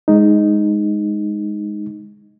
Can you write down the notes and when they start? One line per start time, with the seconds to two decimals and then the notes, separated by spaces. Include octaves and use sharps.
0.08 G#3 D#4